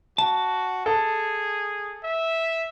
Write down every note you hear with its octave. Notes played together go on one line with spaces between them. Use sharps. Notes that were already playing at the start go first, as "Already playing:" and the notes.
F#4 A5
G#4 A4
E5